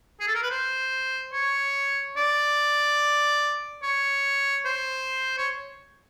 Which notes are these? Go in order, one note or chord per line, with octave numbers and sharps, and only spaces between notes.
G#4
A4
A#4
B4
C5
C#5
D5
C#5
C5
C#5